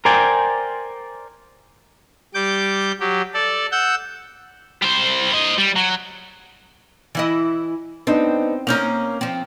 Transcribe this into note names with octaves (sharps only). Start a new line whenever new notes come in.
A#4 C5 D5 G5 G#5
G3 D6 G6
F#3 G4
A4 D5
F#5 E6 G6
G3 C5
C5 D#5
G3
F#3
E3 E4 D#5
B3 C4 D4 D#4
A#3 C#4 D#4 F6 G6 F7
F3 C4